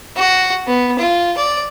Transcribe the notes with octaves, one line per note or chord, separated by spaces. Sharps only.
F#4
B3
F4
D5